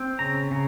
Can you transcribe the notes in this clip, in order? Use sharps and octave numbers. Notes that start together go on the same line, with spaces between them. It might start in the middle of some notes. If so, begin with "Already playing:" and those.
Already playing: C4
C#3 A#5
C#3